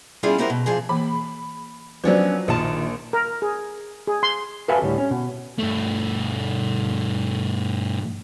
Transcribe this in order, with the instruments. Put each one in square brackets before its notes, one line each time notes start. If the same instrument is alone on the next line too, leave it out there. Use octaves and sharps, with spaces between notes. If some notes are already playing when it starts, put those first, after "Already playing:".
[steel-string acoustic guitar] G3 B3 C#4 E4 F4 G#4
F#3 B3 C4 E4 G4 A#4
B2
A#2 F3 G#4
[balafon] E3 A#3 [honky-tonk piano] B5
[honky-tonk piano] F3 F#3 [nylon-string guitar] B3 C#4 D4 [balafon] B4 C5 D5
[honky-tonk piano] A#1 [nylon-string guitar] D#3 F4 A5
[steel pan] A#4
G#4
G#4
C6
[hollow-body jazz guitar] F#4 A4 B4 E5 F5 G#5
D2 A2 G3
C#4
B2
[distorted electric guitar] G2 A3